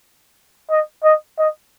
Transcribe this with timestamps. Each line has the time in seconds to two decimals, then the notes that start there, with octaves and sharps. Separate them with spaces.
0.70 D#5
1.04 D#5
1.38 D#5